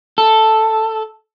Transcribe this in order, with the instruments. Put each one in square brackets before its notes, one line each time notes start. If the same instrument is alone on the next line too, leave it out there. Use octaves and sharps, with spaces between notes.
[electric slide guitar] A4